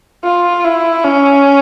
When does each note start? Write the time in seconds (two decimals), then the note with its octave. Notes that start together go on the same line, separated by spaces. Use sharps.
0.24 F4
0.64 E4
1.04 C#4